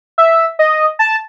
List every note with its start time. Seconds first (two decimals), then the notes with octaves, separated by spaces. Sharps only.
0.18 E5
0.59 D#5
0.99 A5